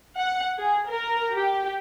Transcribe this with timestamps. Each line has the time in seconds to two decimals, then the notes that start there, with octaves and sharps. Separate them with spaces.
0.18 F#5
0.58 G#4
0.88 A#4
1.34 G4